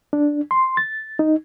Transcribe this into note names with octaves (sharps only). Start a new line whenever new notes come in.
D4
C6
A6
D#4